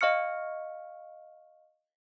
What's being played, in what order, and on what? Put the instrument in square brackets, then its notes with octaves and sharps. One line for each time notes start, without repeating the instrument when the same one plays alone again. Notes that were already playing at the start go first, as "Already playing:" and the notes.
[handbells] D#5 F5 C#6 F6 C#7